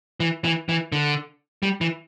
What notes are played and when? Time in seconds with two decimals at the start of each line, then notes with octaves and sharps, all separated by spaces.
0.20 E3
0.44 E3
0.69 E3
0.92 D3
1.63 G3
1.81 E3